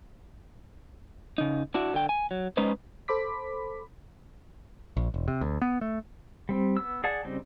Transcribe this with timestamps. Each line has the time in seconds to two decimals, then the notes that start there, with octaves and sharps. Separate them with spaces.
1.38 C#3 D#4
1.74 D4 E4 F#4
1.94 D3 G5
2.09 G#5
2.31 F#3
2.57 G#3 C#4 D#4 B4 C5
3.08 A4 C5 B5 D6 B6
4.97 A#1
5.14 E1
5.28 C3
5.41 D2
5.62 B3
5.81 A3
6.49 G3 C4
6.77 B3 E6
7.04 G#4 D5 F#5 A5
7.24 C#3 G3 C4 D#4